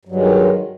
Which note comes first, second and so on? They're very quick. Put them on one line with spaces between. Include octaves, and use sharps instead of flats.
G2 F#3 G#3 D#3